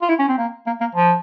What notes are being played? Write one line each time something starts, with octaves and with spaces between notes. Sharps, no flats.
F4
E4
C#4
C4
A#3
A#3
A#3
F3